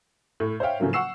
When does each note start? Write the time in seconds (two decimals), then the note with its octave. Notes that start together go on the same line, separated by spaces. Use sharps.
0.40 A2
0.60 C5 C#5 E5 F5 G5
0.80 A2 C#3 F3 F#3 A#3
0.93 F#5 C#6 E6 C7 E7